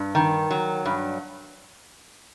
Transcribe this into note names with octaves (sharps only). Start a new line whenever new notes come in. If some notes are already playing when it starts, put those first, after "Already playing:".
Already playing: G2
D#3
F#3
G2